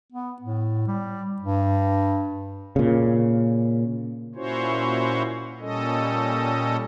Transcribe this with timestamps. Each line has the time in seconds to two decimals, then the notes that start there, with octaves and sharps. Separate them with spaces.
0.12 B3
0.42 A2
0.87 G3
1.42 G2
2.76 A#2 C#3
4.35 A#2 C#4 E4 F#4 C5 C#5
5.60 A#2 G3 C#4 A4 D#5